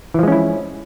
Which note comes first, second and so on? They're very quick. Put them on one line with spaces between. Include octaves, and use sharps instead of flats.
E3 F3 G#3 C#4 E4